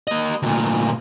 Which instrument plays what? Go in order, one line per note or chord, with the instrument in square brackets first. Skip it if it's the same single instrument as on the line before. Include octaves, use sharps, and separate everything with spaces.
[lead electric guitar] A#3 D#5
D2 A#2